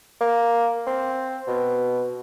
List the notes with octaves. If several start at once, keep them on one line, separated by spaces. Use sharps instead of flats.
A#3
C4
B2